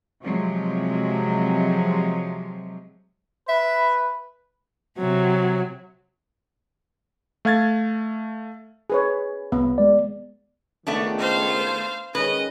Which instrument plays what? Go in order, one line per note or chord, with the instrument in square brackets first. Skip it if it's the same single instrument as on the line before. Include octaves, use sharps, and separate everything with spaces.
[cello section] C3 F3 F#3 G#3
[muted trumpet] B4 [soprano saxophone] E5
[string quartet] C3 F#3
[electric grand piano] A3 F5 G#6 A6
[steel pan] G#4 B4 C#5
[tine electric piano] C2 [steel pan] B3
[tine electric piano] G#3 D5
[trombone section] C#2 D#3 [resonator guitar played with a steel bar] A3 B3 D4
[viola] C5 F5
[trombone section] D#3 G#3 C#4 [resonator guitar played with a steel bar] B4 [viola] D#5